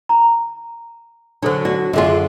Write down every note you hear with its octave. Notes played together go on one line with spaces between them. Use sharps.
A#5
D3 F#3 D4 A4 C5
F#4 D5
F#2 D3 D4 F4 G#4